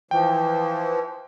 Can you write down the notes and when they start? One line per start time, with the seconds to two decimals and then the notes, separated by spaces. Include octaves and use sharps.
0.11 E3 F3 G5